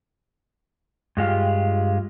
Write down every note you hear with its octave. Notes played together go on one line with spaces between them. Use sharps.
G2 G#3 F4 G4